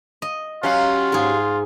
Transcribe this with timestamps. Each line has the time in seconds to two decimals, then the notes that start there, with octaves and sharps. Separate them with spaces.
0.22 D#5
0.63 F#3 C#4 F4 G4 F5 F#5
1.12 G#2 G#4